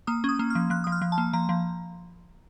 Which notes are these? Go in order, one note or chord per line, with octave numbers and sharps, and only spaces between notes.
A#3 D#6
C#4 D#6
A#3
F6
F3
F3 F#6
F3 D#6
F6
F3
A5
A#3
F3 A#5
F3